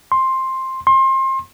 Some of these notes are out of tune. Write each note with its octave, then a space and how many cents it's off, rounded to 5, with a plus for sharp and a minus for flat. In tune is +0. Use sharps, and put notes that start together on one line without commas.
C6 +10
C6 +30